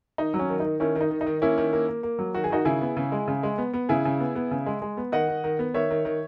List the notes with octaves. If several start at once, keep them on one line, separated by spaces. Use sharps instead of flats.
D#3 D#4
F#3
C#4
D#3
D#4
D#3
D#3 C#4 E4
D#3
D#4
D#3
D#4
D#3
A#3 C#4 E4
D#3
A#3
A#3
A#3
F#3
D#3 F#4
G#4
D#3 D#4 F#4
C#3 E4 G#4
B3
C#3
G#3
C#3
G#3
B3
B3
C#3 E4 G#4
C#3
B3
B3
C#3
G#3
G#3
B3
D#3 D#5 F#5
D#3
D#3
B3
D#3 C#5 E5
D#3
D#3